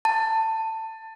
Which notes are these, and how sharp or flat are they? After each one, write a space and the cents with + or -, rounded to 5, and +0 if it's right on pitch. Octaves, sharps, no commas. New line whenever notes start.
A5 +20